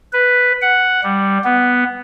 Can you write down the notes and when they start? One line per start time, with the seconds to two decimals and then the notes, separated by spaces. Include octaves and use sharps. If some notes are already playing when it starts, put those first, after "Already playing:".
0.13 B4
0.62 F#5
1.03 G3
1.44 B3